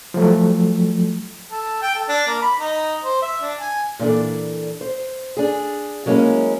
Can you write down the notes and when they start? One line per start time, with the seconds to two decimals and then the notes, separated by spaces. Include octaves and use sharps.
0.14 F3 F#3 A3
1.51 A4
1.82 G5
1.95 A4
2.09 D4
2.27 A#3
2.42 B5
2.60 D#4
3.03 C5
3.22 E5
3.42 D4
3.60 G#5
3.99 A#2 E3 D4 A4
4.81 C5
5.37 D4 G#4
6.06 F#3 G#3 A#3 C#4 E4